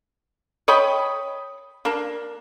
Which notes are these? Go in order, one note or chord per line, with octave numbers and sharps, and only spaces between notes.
C#5 D#5 G5 B5
A#3 D4